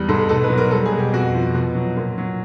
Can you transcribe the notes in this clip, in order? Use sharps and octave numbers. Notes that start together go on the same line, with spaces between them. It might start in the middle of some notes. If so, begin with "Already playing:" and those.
Already playing: E2 G3
G#2 A4
B2 A4
B4
F#3
A#4
G3 A4
G#4
B2
G4
F2 F#4
F3
B2
F#3
A#2
F#3